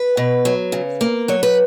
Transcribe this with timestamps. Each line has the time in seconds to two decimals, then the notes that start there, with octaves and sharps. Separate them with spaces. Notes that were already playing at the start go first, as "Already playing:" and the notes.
Already playing: B4
0.17 B2
0.45 F#3
0.72 C#3
1.01 A#3
1.28 F#3 C#5
1.43 B4